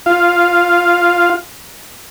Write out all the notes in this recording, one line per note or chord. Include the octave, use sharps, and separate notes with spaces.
F4 F5